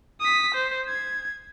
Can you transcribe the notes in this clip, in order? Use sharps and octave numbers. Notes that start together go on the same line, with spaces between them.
D#6 B6
C5
G#6